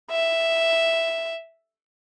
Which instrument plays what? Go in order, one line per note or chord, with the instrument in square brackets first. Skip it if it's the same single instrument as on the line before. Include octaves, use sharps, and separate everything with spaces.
[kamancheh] E5